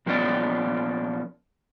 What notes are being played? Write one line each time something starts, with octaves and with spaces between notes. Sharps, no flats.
A#2 F3 A#3 B3 C#4 D5